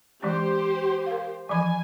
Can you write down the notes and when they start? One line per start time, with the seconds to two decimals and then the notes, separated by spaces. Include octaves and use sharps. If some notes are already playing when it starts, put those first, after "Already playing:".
0.23 E3 G#3 C#4 G4 C5
1.06 A#4 F5
1.49 E3 F3 G#5 B5